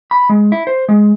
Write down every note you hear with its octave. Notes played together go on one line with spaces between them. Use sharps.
B5
G#3
E4
C5
G#3